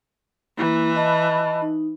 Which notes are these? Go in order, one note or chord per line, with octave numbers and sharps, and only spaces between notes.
E3 A#3 E4
D#5 A5 B5
D#4